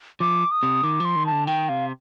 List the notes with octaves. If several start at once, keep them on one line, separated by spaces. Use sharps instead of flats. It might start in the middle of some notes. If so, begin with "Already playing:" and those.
F3 D6
D#6
C3
D#3 D6
F3 C6
D#3
A5
D3
D#3 G5
C3 F5